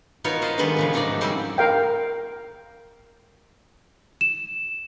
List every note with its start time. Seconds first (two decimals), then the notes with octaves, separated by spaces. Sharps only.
0.24 B3 D#4 F4 F#4 A#4 C#5
0.42 D#4 F4 B4 C5 D#5
0.58 D3 D#3 G3 G#3 B3 B4
0.77 A2 C#3 F3
0.93 F2 G#2 D4 D#4 F#4 D5
1.21 C#3 G3 C4 E4 G4 C5
1.58 A#4 F5 G5
4.21 E7